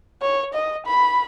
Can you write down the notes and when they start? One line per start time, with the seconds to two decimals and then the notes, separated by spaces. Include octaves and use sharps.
0.22 C#5
0.54 D#5
0.86 B5